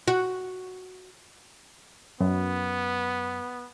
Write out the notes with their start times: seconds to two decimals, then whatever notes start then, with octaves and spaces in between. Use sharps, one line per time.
0.08 F#4
2.21 F#2 B3